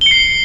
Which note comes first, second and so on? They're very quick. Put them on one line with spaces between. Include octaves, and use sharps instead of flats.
G7 C#7 C7